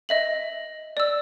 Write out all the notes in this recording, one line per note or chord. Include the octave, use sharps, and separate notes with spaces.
D#5 E5 F#7
D5 E6